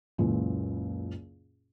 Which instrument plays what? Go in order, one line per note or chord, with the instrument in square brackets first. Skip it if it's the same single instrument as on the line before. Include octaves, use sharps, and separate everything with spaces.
[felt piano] F#1 C#2 A#2 E3